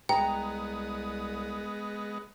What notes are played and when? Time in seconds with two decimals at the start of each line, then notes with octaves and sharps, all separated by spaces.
0.09 C2 G#3 B3 D#5 G5 A#5